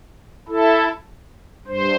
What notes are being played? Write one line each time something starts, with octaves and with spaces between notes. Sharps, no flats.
E4 A4
G2 C5